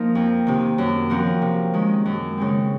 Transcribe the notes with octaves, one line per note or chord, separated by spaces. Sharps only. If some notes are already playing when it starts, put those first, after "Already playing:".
Already playing: F3 A#3 D#4 A#4
F2
C3 D#3
F#2
F3 C4 F#4 A#4
C3
D#3 G#3 C#4
F#2
C#3 G#3 C4